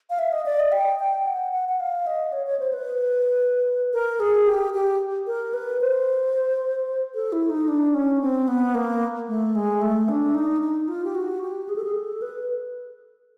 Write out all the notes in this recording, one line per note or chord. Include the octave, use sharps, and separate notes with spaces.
F5
E5
D#5
D5
D#5
G5
G5
F#5
F#5
F#5
F5
D#5
C#5
C#5
C5
B4
A#4
G#4
G4
G4
A#4
B4
C5
A4
E4
D#4
D4
C#4
C4
B3
A#3
A3
G#3
A3
D4
D#4
D#4
F4
G4
F#4
G4
G#4
A4
G#4
A4
B4